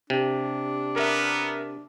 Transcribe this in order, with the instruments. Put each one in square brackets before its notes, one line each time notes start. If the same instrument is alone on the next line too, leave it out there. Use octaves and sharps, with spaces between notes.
[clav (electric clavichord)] C3 [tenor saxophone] D4
[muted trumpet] B3 [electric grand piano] A#4 E5